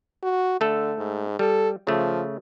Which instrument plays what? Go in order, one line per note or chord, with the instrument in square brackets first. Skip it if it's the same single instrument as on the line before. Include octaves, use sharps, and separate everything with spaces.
[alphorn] F#4
[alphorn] D3 [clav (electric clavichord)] A3 A4
[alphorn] G#2
[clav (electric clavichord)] G3 [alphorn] A4
[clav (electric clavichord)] C#3 A3 [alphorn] F3